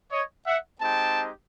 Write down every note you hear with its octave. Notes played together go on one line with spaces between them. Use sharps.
C#5 D#5
E5 F#5
G#3 C4 D#4 G4 G5 A5